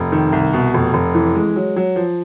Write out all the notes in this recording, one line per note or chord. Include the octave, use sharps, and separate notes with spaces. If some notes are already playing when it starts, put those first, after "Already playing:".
Already playing: F1
D#3
C2
B2
F1
F1
E3
G#3
F#3
F#3
F3